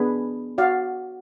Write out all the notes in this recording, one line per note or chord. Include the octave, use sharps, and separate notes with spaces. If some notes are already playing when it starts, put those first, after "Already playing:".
Already playing: B3 D4 G#4 B4
F#4 D5 F5